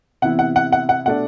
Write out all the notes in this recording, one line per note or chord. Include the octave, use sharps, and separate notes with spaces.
C3 E3 B3 E4 F#5
F#5
F#5
F#5
F#5
B2 A3 D4 F#5